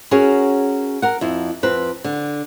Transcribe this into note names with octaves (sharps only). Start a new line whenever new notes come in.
C#4 F#4 G#4 A#4
A#4 F#5
F2 E4
F2 C4 B4
D3